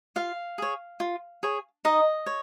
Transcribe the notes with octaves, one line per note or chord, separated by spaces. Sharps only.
F4 F5
G#4 C#5
F4
G#4 C#5
D#4 D#5
C#5